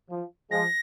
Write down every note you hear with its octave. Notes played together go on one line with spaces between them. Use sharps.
F3
F3 G#3 A#6